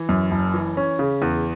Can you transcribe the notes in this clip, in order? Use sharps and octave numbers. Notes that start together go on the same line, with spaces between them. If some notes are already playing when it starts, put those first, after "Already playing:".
Already playing: E3
F#2
F#1
E3
C#4
C#3
E2